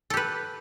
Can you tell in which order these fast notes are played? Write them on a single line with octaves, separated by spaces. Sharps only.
A4 G4 B4